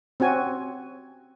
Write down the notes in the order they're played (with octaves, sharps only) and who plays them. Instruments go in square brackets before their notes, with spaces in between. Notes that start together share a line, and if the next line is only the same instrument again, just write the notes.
[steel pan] C4 C#4 F#4 G#5